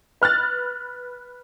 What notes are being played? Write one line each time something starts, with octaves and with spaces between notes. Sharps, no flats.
B4 F6 F#6 A6